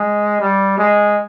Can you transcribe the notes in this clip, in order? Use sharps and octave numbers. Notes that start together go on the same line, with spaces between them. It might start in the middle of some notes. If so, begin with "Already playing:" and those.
Already playing: G#3
G3
G#3